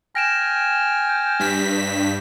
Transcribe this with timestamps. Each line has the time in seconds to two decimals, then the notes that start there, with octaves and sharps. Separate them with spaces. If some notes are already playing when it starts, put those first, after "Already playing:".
0.15 G5 G#5 F6 A#6 D7 E7
1.09 G6
1.40 G2 B6